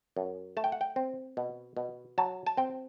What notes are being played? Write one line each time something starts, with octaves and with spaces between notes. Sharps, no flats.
F#2
A3 A5
G5
F#5
G5
C4
B2
B2
F#3 A5
A5
C4 G5